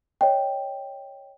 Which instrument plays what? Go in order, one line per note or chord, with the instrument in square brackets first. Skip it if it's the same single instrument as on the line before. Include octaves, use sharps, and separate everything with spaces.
[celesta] C#5 D#5 G5